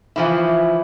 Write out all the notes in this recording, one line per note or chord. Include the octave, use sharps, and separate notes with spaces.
E3 F3 E4